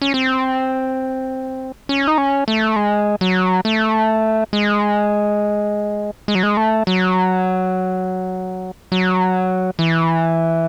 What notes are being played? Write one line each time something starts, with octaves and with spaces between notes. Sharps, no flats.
C#4
C4
C#4
D#4
C#4
A3
G#3
F#3
A3
G#3
G#3
F#3
G#3
A3
F#3
F#3
E3